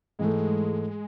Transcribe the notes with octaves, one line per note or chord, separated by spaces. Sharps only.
G#2 E3 G#3 A3